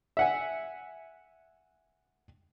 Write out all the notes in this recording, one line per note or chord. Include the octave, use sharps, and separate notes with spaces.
E5 F#5 G#5